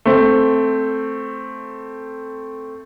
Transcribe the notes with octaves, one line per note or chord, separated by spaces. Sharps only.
A3 C4